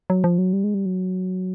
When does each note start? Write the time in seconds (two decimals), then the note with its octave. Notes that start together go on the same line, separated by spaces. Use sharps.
0.10 F#3
0.24 F3
0.38 F#3
0.53 G3
0.64 G#3
0.74 G3
0.86 F#3